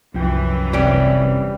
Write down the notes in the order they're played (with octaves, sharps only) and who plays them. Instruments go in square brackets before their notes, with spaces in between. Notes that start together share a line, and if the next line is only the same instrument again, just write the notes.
[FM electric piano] C2 F3 G5 [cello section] F#2 E3
[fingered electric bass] F1 C3 [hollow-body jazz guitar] G3 C#4 G4